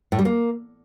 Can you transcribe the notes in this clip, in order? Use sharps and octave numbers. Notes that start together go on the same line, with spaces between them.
A2
G3
A#3